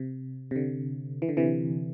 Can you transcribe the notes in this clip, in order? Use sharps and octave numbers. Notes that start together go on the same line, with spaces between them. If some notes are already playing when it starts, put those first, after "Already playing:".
Already playing: C3
C3
D3
E3
D3
C3 E3